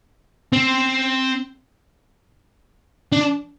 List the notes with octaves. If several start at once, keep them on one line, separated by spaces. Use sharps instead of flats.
C4
D4